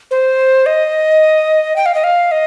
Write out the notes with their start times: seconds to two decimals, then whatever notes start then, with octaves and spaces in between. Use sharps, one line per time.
0.11 C5
0.66 D#5
1.76 G5
1.86 F5
1.94 D#5
2.04 F5
2.32 D#5